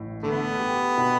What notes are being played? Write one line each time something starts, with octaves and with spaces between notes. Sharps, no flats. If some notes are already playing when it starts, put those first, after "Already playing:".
Already playing: A1 A2
D3 A3 B3
G4
B2